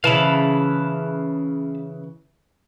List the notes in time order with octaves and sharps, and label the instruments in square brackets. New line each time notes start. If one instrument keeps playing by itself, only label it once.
[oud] C#3 E3 [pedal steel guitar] F5 A5 B5